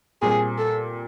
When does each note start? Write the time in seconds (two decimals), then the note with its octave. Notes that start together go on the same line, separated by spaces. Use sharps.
0.22 A#2 G3 C4 G#4
0.58 A4